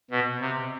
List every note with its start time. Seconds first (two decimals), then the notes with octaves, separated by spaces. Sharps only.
0.11 B2
0.40 C3